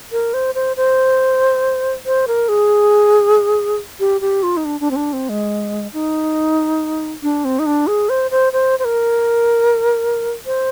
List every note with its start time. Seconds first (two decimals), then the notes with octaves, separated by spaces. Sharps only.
0.12 A#4
0.34 C5
0.55 C5
0.77 C5
2.06 C5
2.28 A#4
2.49 G#4
4.00 G4
4.21 G4
4.43 F4
4.57 D#4
4.65 D4
4.80 D4
4.91 C4
4.96 D4
5.13 C4
5.29 G#3
5.94 D#4
7.23 D4
7.45 C4
7.59 D#4
7.66 D4
7.87 G#4
8.09 C5
8.31 C5
8.53 C5
8.79 C5
8.85 A#4
10.46 C5